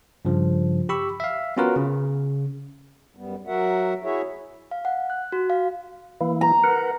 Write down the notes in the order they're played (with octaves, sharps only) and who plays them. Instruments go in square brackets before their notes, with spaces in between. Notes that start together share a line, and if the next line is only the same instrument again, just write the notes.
[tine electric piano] G2 C#3 F3
G4 B5 C#6 E6
E5 F5
B3 C#4 F4 F#4 A#4 B4
C#3
[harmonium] F#2 G3 B3
F#3 F#4 A#4 E5 F#5
E4 F#4 G#4 C#5 E5
[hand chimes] F5
F#5
F#6
F#4
F5
[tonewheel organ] E3 A#3 E4
[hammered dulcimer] A#5
[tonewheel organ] A#4 B4 F#5